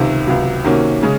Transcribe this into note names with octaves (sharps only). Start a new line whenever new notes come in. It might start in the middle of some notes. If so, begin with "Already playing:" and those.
Already playing: C#2 C3 D#3
C#2 C3 F#3
C3 D#3 A#3 C#4 F#4
C#3 G#3 C#4